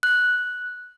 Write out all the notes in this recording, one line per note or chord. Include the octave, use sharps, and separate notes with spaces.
F#6